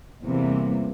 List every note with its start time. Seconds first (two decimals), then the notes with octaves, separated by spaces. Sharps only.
0.24 E2 C3 E3 G3 A#3